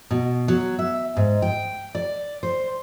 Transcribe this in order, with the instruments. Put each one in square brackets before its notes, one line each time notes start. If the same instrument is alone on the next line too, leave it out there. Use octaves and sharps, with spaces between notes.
[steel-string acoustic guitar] B2
F#3
E5
G#2
G5
D5
C5